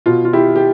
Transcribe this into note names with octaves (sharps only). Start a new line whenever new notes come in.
B2 F4
F4
E4 G4
G4